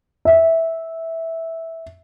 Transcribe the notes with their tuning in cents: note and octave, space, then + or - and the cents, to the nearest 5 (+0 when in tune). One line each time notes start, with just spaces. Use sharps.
E5 -10